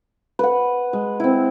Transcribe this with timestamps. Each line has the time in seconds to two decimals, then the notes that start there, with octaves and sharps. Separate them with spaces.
0.39 B4 F#5
0.93 G#3
1.20 C4 E4